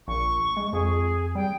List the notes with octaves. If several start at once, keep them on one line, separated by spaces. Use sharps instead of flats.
A#1 C#6
G#3
F2 G#4
G3 G5